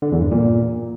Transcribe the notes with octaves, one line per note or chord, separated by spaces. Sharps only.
D3
E2
G2
A#2